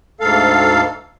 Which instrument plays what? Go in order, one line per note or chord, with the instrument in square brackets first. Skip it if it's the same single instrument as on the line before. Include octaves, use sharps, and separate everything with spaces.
[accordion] D2 G#2 A4 F5